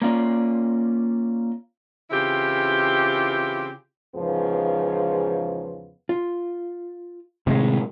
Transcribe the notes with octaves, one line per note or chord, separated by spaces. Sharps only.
A#3 C#4 F4 D5
C#3 E3 C4 E4 F4 G4
E2 G#2 C#3 F3 B3 G#4
F4
A2 C3 D#3 G#3 F5